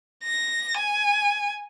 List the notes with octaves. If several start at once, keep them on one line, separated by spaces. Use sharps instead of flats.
A#6
G#5